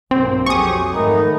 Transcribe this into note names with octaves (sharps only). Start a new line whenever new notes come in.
B1 G2 A#3 C4
F2 F#3 G4 G#4 C#6 D#6
G#2 D#3 A3 B3 D#4 A#4